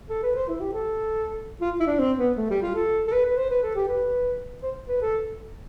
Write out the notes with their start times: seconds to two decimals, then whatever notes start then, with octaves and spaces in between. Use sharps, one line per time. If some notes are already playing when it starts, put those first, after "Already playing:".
0.10 A4
0.23 B4
0.36 C5
0.48 E4
0.60 G4
0.73 A4
1.61 F4
1.80 E4
1.87 D4
1.99 C4
2.18 B3
2.37 A3
2.50 G3
2.62 F4
2.75 A4
3.07 A4
3.12 B4
3.26 B4
3.37 C5
3.50 B4
3.63 A4
3.75 G4
3.88 B4
4.63 C5
4.88 B4
5.02 A4